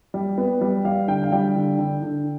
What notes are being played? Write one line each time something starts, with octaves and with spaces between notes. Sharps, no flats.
G3
B3
G3
G3 F5
D3 G5
F5
G3 G5
D3
D3
D3